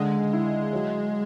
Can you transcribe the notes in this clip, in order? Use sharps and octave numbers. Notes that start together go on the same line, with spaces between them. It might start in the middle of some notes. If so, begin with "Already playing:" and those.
Already playing: C#2 D3 G#3
E4
F#3